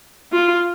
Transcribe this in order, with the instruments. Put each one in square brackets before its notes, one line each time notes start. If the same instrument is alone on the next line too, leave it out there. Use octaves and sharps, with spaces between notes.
[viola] F4